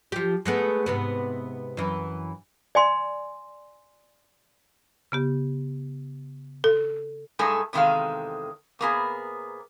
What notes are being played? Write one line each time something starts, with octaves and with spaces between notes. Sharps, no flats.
F3 G4
G#3 A3 B3
G#2 C3 B3
F#2 E3
D5 G#5 C6
C#3 B3 G4
A4
G2 G#3 A3 D#4 A4 G#5
E2 C3 D#3 G#3 A4 F5
C3 A#3 B3 G#4